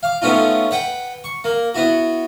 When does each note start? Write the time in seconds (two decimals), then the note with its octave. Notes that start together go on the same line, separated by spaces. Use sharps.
0.03 F5 D6
0.22 A3 B3 C#4 D#4 F4
0.71 B4 F#5 G5
1.24 C#6
1.44 A#3
1.74 B3 E4 F#4